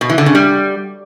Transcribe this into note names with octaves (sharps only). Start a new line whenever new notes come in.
B2
E3
D3
C#3
G3